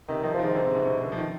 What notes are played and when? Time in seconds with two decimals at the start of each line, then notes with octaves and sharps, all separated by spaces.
0.08 C3 D#3
0.23 D#3 F3
0.34 F3
0.39 D#3
0.44 G#2
0.54 G#2 D3
0.65 C3
0.75 B2
0.85 B2
1.02 D3
1.12 F3
1.17 D#3